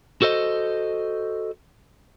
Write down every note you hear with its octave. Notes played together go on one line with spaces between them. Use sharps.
F#4 A4 C5 D#5